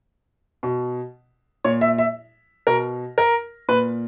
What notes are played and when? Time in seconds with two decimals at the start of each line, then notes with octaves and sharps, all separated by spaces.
0.63 B2
1.64 A#2 C#5
1.81 E5
1.98 E5
2.67 B2 A#4
3.18 A#4
3.69 A#2 B4